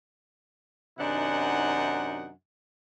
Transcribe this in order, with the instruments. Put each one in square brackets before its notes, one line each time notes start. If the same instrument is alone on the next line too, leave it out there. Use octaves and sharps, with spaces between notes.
[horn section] F#2 C3 D#3 D4 D#4 F#5